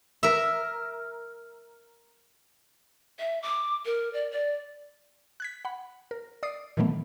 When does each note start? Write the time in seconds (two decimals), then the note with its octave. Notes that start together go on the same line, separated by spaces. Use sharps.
0.23 A#4 E5
3.19 E5
3.42 D6
3.85 A#4
4.13 D5
4.31 D5
5.40 F#6 G#6 B6
5.65 F#5 B5
6.11 A#4
6.43 D5 D#6 C7
6.77 A#2 D#3 E3 F#3 A3 B3